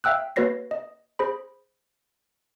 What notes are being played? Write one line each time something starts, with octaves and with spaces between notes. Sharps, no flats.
E5 F5 G5 E6 F#6
A#3 F#4 B4 C#5 A#6 C7
D#5
G#4 C5 B5